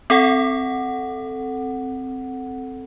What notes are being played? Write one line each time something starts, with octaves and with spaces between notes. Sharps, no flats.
C4 A4 F#5